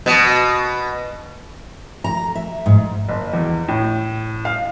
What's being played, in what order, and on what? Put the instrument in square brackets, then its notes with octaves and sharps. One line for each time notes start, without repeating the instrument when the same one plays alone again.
[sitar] B2
[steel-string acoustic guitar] A#5
E5
G#2
[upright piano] F#1
E2
A2
F5